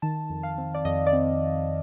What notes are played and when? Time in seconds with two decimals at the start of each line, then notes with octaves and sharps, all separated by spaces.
0.02 D#3 A5
0.30 F2
0.43 F5
0.58 C4
0.74 D5
0.85 F2 D#5
1.07 D5
1.13 C4